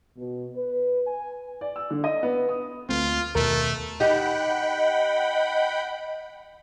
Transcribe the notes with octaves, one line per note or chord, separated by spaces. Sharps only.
B2
B4
G#5
D5
E6
D3
D#5
B3
D#6
D2 A3 C4 F4
D#2 B2 A3 A#4
D#4 G4 D#5 F#5 G5 B5